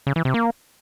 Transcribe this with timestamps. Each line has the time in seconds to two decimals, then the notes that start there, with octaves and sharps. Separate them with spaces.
0.07 C#3
0.16 E3
0.25 C3
0.34 A#3